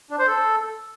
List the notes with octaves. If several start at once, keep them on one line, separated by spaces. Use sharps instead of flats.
D4
C5
A4